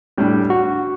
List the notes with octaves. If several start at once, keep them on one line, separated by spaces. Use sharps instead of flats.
A2 G3 D4
F#4